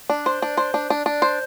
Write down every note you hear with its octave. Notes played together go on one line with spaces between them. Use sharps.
D4
C5
D4
C5
D4
D4
D4
C5